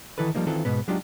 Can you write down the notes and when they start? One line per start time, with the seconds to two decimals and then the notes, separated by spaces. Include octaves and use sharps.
0.18 D#3 E3 E4 A4 B4
0.35 F3 G3 A#3 D#4
0.46 D#3 E3 C4 F4 A4
0.65 G#2 B2 B3
0.88 F#3 G#3 D4 D#4 F4 G4